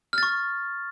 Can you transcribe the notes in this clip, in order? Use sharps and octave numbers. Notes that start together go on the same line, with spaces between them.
C#6 F6 A6